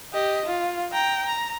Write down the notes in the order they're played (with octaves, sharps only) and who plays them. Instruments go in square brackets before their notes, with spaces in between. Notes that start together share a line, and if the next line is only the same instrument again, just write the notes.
[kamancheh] G4 D#5
F4
G5 A#5
A#5